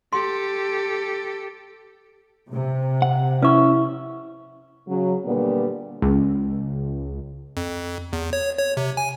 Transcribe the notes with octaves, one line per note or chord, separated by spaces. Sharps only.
G4 A4 C6
C3
F#5
C#4 E4 B4 E5 C#6
C#3 F#3
A#2 D3 G3 B3
C#2
F2
E2
C#5
C#5
C3
G#5